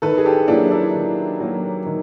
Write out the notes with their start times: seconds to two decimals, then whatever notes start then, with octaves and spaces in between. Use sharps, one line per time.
0.02 D#3 A4 B4
0.18 G#4
0.26 G4 A4
0.48 F#3 A#3 D4 E4
0.71 D4 E4
0.94 D#3
1.40 F#3 A#3
1.86 D#3